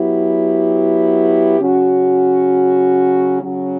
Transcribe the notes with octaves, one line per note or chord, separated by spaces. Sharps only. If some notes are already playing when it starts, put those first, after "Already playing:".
Already playing: F#3 B3 E4 G4
C#3 F#3 C#4 F#4
C#3 F#3 C#4 F#4